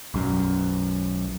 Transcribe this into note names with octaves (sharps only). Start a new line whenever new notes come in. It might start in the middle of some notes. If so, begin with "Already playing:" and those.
B1 F#2